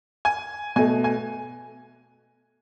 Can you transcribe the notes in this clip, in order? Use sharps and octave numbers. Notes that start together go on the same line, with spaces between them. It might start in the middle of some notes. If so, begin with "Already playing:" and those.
G#5
B2 A3 G#5
G#5